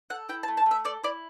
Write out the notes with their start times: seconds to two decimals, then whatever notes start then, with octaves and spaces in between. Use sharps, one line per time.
0.10 A4 F#5
0.29 E4 G5
0.43 A5
0.48 A3
0.57 A5
0.66 A3
0.71 E5
0.85 A4 D5
1.04 E4 D5